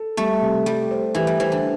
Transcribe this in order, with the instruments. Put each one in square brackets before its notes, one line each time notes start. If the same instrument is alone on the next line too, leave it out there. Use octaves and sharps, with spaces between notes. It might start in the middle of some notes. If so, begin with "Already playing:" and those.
Already playing: [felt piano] A4
[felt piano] G3 [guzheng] A3
[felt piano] C3
[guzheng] G3 [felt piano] G4
[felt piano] C5
[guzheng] E3 [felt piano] G4
[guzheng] G3
[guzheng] E3 [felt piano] C5
[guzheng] D3